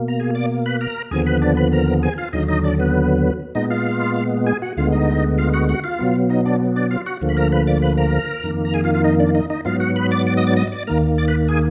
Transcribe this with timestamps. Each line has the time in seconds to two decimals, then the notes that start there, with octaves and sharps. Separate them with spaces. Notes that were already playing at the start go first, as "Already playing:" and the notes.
Already playing: B2 A#3
0.08 A#5
0.20 G#4 G#5
0.35 D5 D6
0.66 B4 B5
0.81 A#4 A#5
1.11 D#2 D3 F3 B3 G#4 G#5
1.26 B4 B5
1.42 D4 D5
1.57 B4 B5
1.72 A#4 A#5
2.03 G#4 G#5
2.18 F4 F5
2.33 D#2 D3 F#3 D#4 D#5
2.49 D#4 D#5
2.63 D4 D5
2.79 B3 B4
3.55 A#2 G#3 B3 D#4 D#5
3.70 F4 F5
4.47 G#4 G#5
4.62 F#4 F#5
4.77 D2 D3 G#3 B3 F4 F5
4.92 D#4 D#5
5.38 F4 F5
5.54 F#4 F#5
5.69 F#4 F#5
5.84 F4 F5
5.99 B2 F#3 B3
6.29 D#4 D#5
6.46 D4 D5
6.76 D4 D5
6.91 F4 F5
7.06 F#4 F#5
7.21 D2 D3 F3 A#3
7.29 B5
7.37 A#4 A#5
7.52 B4 B5
7.67 D5 D6
7.82 B4 B5
7.98 A#4 A#5
8.44 F2 D#3 A#3
8.65 A#5
8.74 G#4 G#5
8.84 F4 F5
8.94 F4 F5
9.04 D#4 D#5
9.19 D4 D5
9.35 D#4 D#5
9.50 D#4 D#5
9.65 G#2 F#3 B3 F4 F5
9.80 F#4 F#5
9.96 B4 B5
10.11 D5 D6
10.27 D5 D6
10.37 D#5 D#6
10.47 D5 D6
10.57 D#5 D#6
10.72 D5 D6
10.87 D#2 D#3 A#3 A#4 A#5
11.18 D5 D6
11.28 B4 B5
11.48 G#4 G#5